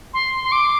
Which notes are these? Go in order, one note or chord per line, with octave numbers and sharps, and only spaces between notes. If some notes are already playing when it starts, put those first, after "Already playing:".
C6
C6
D6